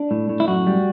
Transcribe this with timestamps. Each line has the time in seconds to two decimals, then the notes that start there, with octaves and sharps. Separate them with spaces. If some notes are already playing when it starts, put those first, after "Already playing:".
Already playing: D4
0.11 A2
0.29 A2
0.40 E4
0.48 F#2 F#4
0.67 G3